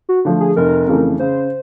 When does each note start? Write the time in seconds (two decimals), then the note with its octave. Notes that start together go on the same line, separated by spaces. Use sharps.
0.09 F#4
0.25 D3 F3 A3
0.40 G#4
0.56 F1 A#4
0.87 F2 C#3 E3 A3
1.19 C#3 C5